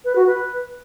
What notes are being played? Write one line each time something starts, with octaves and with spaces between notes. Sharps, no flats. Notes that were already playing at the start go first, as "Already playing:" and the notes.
B4
F#4
B4